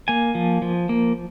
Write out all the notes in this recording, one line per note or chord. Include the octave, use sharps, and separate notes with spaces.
A#3 G#5
F3
F3
A#3